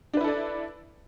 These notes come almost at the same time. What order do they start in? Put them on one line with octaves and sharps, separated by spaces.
D4 B4 E4 A4 D5